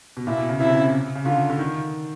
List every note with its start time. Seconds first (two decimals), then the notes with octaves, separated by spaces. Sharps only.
0.17 B2
0.27 A#2 E4
0.38 B2
0.49 C#3
0.60 C3 E4
0.70 C#3
0.80 C3
1.15 C#3
1.26 D3 F4
1.50 D3
1.59 D#3